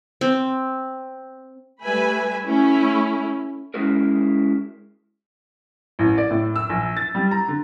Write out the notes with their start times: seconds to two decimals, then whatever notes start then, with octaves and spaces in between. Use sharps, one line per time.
0.21 C4
1.83 G3 A3 B4 E5 G#5 B5
2.46 A3 C#4 E4
3.74 G#3 C#4 E4 F#4 G#4 A#4
5.99 A1
6.18 D5
6.30 A2
6.56 E6
6.70 A#1
6.97 A6
7.15 G3
7.31 A#5
7.48 D3